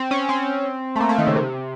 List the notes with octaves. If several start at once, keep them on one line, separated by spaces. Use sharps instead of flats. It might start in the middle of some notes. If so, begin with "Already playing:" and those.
Already playing: C4
C#4
C4
A3
A#3
A3
D#3
C#3
C3